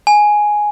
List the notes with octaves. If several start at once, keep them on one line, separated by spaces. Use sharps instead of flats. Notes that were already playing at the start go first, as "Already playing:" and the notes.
G#5